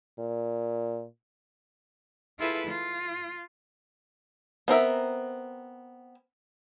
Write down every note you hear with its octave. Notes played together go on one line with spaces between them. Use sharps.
A#2
E4 F4 G#4 A4 B4 E5
F4
B3 C4 A#4 E5